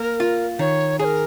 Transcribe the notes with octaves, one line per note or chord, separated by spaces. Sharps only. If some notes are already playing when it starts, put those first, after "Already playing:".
Already playing: A#3 A#4
F4
D#3 C#5
G#4 C#5
A#4